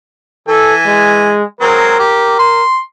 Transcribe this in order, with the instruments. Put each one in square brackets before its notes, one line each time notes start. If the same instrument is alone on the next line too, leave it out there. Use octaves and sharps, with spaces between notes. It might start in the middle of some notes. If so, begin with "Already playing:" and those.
[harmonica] E3 G#5 [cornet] A4
[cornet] G#3
[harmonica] F#3 G#3 C4 [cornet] A#4
[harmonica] G4
C6